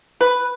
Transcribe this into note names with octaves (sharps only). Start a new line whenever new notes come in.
B4